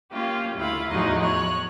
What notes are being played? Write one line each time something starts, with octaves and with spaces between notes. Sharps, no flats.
A#3 C#4 F4 G4
D2 E4 F4 B5
E2 A2 F3 F#3 D#4 D#5
C#5 F#6